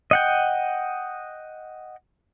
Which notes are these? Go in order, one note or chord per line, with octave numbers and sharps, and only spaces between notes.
D#5 F#5 G5